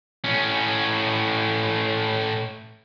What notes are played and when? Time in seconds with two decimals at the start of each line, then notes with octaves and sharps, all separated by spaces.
0.24 A2 C#4